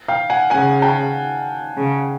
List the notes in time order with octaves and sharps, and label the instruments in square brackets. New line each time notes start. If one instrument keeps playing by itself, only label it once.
[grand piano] F5 G5
F#5 G#5
[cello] C#3 [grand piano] F#5 G#5
[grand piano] G5 A5
[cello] C#3